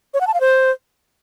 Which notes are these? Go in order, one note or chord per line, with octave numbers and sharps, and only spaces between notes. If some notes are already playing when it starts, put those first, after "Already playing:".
C#5
F#5
A5
F5
C5